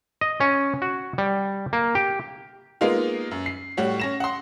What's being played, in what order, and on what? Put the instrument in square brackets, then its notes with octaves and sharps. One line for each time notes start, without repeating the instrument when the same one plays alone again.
[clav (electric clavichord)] D#5
C#4
F#4
G3
A#3
G4
[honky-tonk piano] G#3 A#3 B3 D#4 F4
F#2
C7
A2 G3 F#4 C#5
C#4 A#6 E7
F#5 C6